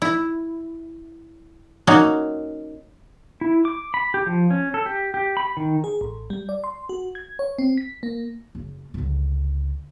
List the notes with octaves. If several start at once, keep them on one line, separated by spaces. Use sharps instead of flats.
E4
A#3 C#4 D#4 F#4
E4
D6
B5
G4
F3
C#4
A4
G4
G4
B5
D#3
G#4
A1
G3
D5
C6
F#4
G#6
C#5
C4
B6
A#3
F#1
C#2 D3